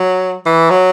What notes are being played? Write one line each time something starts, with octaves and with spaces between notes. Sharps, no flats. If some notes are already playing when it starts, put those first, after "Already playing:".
Already playing: F#3
E3
F#3